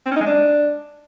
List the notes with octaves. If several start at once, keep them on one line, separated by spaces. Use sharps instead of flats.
C4
C#4
D#4
G#3
D4